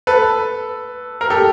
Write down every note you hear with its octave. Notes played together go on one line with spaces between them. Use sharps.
A4 B4
A#4
G4 A4